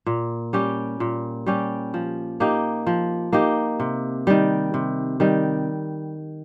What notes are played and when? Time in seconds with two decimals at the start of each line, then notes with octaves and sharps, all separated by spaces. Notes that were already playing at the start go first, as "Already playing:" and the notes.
0.06 A#2
0.53 G3 C#4 G4
1.00 A#2
1.46 G3 C#4 G4
1.94 F3
2.40 A#3 D#4 G4
2.87 F3
3.33 A#3 D#4 G4
3.80 C3
4.27 D#3 G3
4.74 C3
5.20 D#3 G3